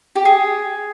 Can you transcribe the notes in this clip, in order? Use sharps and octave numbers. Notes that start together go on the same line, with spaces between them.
G4
G#4